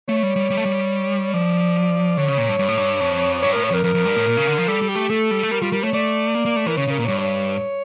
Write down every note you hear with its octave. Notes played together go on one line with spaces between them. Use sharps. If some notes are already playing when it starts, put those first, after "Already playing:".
A3 C#5
G3
G3
G3
A3
G3
F3 D5
D3 C#5
C#3
A#2
G2
G2
A2
G2
F2
G2 C#5
A2 A#4
C#5
F2 A#4
F2 A#4
F2
G2
A2
A#2
C#3
D3
F3
G3 A4
G3
G4
A3
A3 A4
G3
A3
G3 A#4
G3 F4
G3 A#4
A3 C#5
A3 D5
A#3
A#3
A3
E3 A#4
C#3 C#5
C#3 A#4
A#2
G2 C#5
C#5